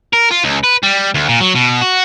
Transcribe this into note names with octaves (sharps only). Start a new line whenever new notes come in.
A#4
F4
C#2
B4
G3
D2
A#2
F#3
B2
F#4